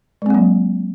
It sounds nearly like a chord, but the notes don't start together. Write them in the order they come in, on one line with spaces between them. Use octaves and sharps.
G#3 C4 A#3 F#3